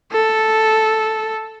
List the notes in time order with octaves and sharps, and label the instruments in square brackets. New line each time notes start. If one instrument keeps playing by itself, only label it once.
[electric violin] A4